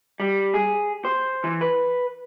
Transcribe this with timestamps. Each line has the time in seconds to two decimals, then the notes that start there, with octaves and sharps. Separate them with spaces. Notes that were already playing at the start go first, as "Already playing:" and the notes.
0.20 G3
0.54 G#4
1.05 C5
1.44 E3
1.61 B4